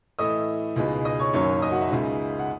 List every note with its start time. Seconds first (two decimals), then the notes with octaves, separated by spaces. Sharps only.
0.19 A2 E3 A3 E4 D#5 D#6
0.76 C#2 B2 G#3 D#4
1.05 D#5 D#6
1.19 C#5 C#6
1.33 F#1 F#2 D#3 F#3 C#4 C#5 C#6
1.62 D#5 D#6
1.72 F#4 F#5
1.81 E5
1.91 C#2 C#3 G#3 D#4
2.39 F#5